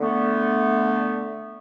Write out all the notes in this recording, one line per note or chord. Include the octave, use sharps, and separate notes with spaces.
D3 A3 B3